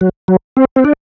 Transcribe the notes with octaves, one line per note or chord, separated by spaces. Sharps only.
F#3
F#3
C4
C4
D4